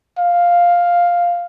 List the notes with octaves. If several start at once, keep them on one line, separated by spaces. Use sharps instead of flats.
F5